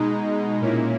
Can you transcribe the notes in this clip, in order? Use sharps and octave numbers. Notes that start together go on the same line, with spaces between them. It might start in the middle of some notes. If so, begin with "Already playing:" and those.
Already playing: B2 G#3 D#4
A#2 A#3 C#4 E4